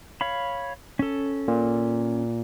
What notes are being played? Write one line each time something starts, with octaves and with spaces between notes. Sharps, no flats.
C#5 F5 B5
C#4 A4
A#2